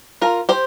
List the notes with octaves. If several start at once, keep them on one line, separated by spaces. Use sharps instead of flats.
F4 A#4
G4 C5